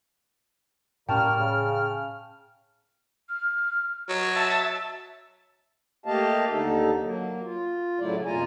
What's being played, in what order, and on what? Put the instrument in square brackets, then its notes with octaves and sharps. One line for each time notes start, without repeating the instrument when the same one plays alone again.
[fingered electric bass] A2 C#4 [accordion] G3 A#3 [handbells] G5 A5 C#6 [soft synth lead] F6
[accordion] C#3
[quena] F6
[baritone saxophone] F#3 [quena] D#5
[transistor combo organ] E5 A5
[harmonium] A3 A#3 G4 D#5 F5 A5
D#2 D3 D#4 A4
F#3 A#3
F4
A2 C#3 F#3 A3 E4 D5
F2 B2 F4 G#5 A#5